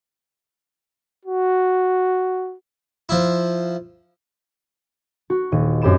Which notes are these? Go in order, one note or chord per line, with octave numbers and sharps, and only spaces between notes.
F#4
F3 E4
F#4
D#1 D#7
F#2 C4 G4 B5 D#7 E7